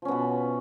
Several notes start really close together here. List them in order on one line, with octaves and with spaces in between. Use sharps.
F3 C#4 B3 B2